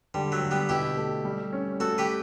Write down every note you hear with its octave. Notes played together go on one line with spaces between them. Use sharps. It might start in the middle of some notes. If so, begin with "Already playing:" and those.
D3 G3
F#3 A3
D3
G3 B3
B2 E4 G4
A3
G3
C#4
A3 F#4 A4
G4 B4